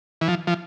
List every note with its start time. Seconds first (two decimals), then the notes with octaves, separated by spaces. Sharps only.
0.21 E3
0.28 F3
0.47 F3